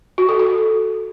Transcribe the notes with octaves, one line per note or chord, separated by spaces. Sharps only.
F#4
A4
A4